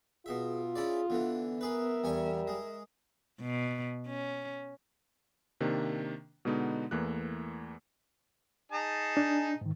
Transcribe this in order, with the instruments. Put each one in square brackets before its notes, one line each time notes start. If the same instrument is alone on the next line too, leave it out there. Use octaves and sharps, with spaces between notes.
[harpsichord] B2 E5 [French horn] F4 [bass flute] G#4
[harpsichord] C#4 E4 D5 [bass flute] G#4
[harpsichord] D3 E3 [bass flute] B3
[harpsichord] G#4 B4 [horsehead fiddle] A#4 E5
[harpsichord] E2 G#5 C#6 [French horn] G3
[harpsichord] G#3
[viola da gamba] B2
C#4
[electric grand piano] C3 D#3 A#3 D4
B2 D3 G#3 B3 D#4
E2 E3 A3 A#3 F#6
[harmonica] D#4 G#4 A5
[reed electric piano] D4
G#2 D#3